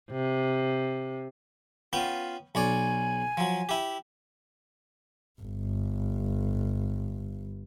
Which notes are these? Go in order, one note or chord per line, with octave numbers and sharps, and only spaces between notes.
C3
B3 C#4 F4 G5
B1 C#5 D5 G#5
F3 F#3
E4 G4
G1 G2